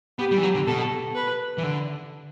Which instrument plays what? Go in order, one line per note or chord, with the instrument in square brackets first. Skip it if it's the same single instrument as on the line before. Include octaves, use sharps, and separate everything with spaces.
[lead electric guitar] B3 [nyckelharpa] G4
[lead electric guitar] G3
E3
F#3
D3
[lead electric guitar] B2 [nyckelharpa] A4
[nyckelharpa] B4
[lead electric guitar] E3
D3